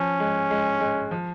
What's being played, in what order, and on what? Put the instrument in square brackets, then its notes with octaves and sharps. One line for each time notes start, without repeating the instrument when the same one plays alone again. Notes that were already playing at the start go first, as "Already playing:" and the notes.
Already playing: [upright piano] F3 [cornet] C#4
[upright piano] G#3
G#3
G#3
F3